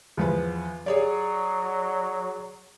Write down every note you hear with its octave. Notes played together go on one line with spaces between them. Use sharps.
E2 F3 B4
F#3 G#4 C#5 D5